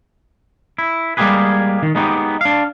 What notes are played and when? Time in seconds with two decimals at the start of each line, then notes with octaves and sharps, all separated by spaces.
0.78 E4
1.17 G3 G#3 A#3 G4 G#4 B4
1.83 D#3
1.95 G#3 B3 D#4 F#4 G4
2.41 D4 F5